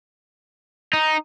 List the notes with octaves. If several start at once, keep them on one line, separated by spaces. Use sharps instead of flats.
D#4